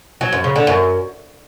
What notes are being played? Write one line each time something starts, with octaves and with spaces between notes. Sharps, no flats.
F#3
F#2
C#3
D3
F#2